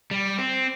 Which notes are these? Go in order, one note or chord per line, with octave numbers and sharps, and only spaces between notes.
G3
C4